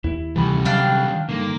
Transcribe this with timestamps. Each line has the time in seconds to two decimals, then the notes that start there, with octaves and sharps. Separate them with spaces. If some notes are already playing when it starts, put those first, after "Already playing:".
0.04 D#2 E4
0.36 D2 C3 D#3 E3 G3 B5
0.65 F#3 D4 F5 G5
1.29 G2 D3 D#3 A#3